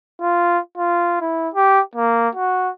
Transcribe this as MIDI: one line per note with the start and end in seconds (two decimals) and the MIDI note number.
0.21 0.59 65
0.77 1.16 65
1.21 1.49 64
1.54 1.81 67
1.95 2.28 58
2.35 2.69 66